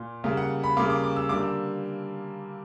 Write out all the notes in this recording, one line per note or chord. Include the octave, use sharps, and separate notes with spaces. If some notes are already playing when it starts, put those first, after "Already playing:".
Already playing: A#2
C#3 G3 A#3
F#5
B5
C#3 G3 A#3 D6
D6
D6
E6
D3 G3 A#3 D6
E6